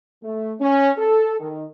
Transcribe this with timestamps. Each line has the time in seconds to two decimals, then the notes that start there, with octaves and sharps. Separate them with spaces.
0.23 A3
0.60 C#4
0.98 A4
1.40 D#3